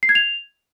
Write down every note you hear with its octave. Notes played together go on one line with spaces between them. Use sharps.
C7
G#6
F7